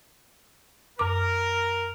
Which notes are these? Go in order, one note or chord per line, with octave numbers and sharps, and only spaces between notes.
F#2 A#4 D6